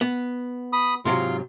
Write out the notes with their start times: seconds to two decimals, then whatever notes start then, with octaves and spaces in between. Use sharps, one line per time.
0.01 B3
0.73 B5 D#6
1.05 G#2 C3 F#3 F4 C6